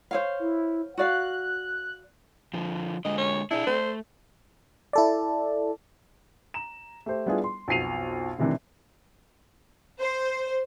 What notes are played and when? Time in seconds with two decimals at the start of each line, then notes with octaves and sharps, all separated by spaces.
0.11 C5 C#5 F5
0.39 E4
0.97 F#4 D5 F5 F#6
2.54 D3 F3
3.05 D3 G#3 D#5
3.18 C#5
3.51 D4 E4 G#4
3.67 A3 C5
4.93 E4 A4 D5
6.54 A#5 E7
7.06 A3 G4 C5
7.26 G3 B3 D4 E4 F4 G#4
7.44 C6
7.68 B1 F2 B2 C7 D#7 F7
8.39 A2 C3 D#3 E3 C4 D4
10.00 C5